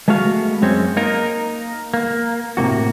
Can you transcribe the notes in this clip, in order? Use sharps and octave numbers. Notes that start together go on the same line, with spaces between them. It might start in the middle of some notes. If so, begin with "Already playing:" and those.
G#3 A3 B3 F#4 F5
F#2 G#3 C4 C#4
A#3 D#4 A#4
A#3
A2 C3 A#3 F#4